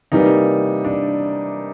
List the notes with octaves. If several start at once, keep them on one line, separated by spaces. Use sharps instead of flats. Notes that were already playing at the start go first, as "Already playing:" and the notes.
C3 E3 G3 A#3 D#4
D4